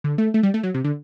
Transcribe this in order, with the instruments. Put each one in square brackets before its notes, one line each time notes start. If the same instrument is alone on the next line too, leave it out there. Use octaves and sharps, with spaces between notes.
[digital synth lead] D3
A3
A3
G3
A3
F#3
C3
D3